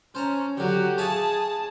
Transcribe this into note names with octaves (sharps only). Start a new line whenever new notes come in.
C#4 C5 A5 A#5
D3 F#3 F#4 G4
G#4 C#5 E5 F5 A5